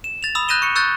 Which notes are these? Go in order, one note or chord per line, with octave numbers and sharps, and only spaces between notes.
E7
A6 F7
B5 D#6 E6 F7
F#6 G6 A#6 D#7 E7 G7
C#6 C#7
C#6 E6 F#6 G6 A6